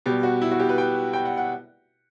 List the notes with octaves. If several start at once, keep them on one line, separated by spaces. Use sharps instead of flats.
B2 G3 G4
F#4
E4
F#4
G4
B4
G5
G5
F#5
F#5